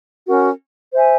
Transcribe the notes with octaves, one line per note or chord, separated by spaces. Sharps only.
C#4 F#4 A#4
C5 E5 G#5